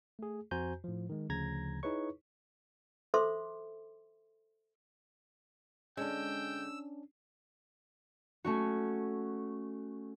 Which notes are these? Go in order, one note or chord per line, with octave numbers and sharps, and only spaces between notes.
A3 G#4
F2 F#4 C5 G#5 A#5 G6
A2 F3
D#3 G#3
D2 C#3 F3 A#5 G#6 A#6
D#4 E4 G#4 B4 C#5 C#6
A4 C5 E5 C6 D6
D3 G#3 C#4 D4 G5 E6
A3 C#4 F#4